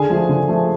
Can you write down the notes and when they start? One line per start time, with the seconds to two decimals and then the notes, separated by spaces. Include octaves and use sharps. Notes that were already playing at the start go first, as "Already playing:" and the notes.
Already playing: D3 G#4 G#5
0.10 F3 A3
0.29 D3
0.49 F3 A3